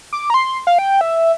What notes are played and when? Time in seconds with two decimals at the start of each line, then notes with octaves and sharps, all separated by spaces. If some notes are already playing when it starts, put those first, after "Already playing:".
0.13 D6
0.30 A#5
0.34 C6
0.67 F5
0.78 G5
1.01 E5